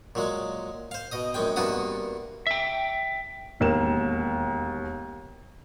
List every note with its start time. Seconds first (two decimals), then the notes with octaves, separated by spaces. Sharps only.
0.15 A#2 F#3 G#3
0.91 C5 F5
1.12 B2 D#5 D#6
1.34 A#1 F#2 G#3 G5
1.56 G2 C3 A#3 B3 F#4 D#6
2.47 E5 G5
3.60 E1 D#2 A#3 E7